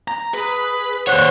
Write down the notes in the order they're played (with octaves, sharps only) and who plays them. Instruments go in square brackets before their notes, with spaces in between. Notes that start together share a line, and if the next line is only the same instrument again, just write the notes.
[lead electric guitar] A#5
[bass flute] G#4 [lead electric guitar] B4
[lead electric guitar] D#2 F#5 [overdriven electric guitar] C5 C#5 [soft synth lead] F#6